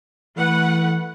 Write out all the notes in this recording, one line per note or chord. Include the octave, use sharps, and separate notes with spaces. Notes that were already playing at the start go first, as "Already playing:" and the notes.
E3 A3 B4 F#5